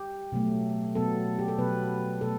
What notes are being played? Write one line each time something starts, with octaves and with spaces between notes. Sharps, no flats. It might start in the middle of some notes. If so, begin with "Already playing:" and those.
Already playing: G4
B2 F#3 A3
B2 F#3 B3 A4
G4
A4
B2 F#3 B3 B4
B2 A3 A4